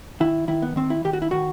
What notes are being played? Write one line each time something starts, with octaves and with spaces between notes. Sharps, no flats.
D#3 E4
D#3 E4
B3
D#3 C4
E4
D#3 G4
F#4
E4
D#3 F#4